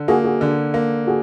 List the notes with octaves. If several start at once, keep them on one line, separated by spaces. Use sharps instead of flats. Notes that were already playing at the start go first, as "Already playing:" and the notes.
Already playing: D3
A#3 F#4 G#4
F#4 G#4
D3
A#3
F#4 G#4